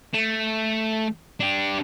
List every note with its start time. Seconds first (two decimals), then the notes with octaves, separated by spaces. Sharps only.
0.14 A3
1.40 D4 G4